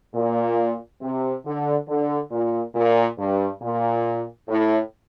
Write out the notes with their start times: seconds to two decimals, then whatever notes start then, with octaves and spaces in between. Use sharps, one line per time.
0.15 A#2
1.02 C3
1.45 D3
1.88 D3
2.31 A#2
2.75 A#2
3.18 G2
3.62 A#2
4.48 A2